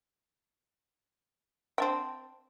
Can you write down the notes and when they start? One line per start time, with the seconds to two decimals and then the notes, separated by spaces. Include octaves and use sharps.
1.78 C4 D4 G5